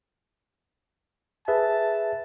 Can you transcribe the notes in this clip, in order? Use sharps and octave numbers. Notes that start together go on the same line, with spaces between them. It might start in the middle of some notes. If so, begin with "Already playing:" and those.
G#4 B4 E5 A5